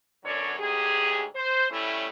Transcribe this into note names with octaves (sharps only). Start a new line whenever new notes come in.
F#2 B2 D3 F#3 C#5 D5
D2 G#2 G4 G#4
C5
A2 G3 A3 C#4 E4